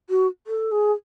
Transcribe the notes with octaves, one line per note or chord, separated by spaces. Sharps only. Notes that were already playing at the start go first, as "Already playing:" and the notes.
F#4
A4
G#4